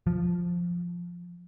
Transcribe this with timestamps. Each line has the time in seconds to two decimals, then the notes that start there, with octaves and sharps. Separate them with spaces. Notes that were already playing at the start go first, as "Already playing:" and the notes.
0.07 F3